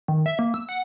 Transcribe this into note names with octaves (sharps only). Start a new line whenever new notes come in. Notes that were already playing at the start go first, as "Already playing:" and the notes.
D#3
E5
A#3
E6
F#5